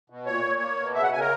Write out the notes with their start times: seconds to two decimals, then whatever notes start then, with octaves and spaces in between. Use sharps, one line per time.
0.10 B2
0.26 A#2 C#5
0.44 A#2
0.60 A#3
0.77 B2
0.95 C#3 E5
1.03 F#5
1.12 C#3 G#5
1.20 A#4